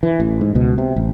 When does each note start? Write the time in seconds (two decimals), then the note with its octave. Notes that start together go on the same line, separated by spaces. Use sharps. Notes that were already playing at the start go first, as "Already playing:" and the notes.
0.03 E3
0.20 A1
0.41 G#2
0.55 C#2 B2
0.78 C3
0.96 A1